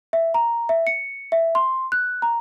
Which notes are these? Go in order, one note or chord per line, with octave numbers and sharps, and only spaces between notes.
E5
A#5
E5
C#7
E5
C6
F#6
A#5